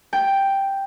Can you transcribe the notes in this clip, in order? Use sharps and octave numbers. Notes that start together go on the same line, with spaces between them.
G5